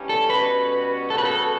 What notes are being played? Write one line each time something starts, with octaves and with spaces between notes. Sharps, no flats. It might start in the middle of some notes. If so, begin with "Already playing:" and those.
Already playing: G2 E3 G3 C#4
A4
B2 G3 C#4 F#4 B4
C#3 G3 B3 F#4 A4
B4
A4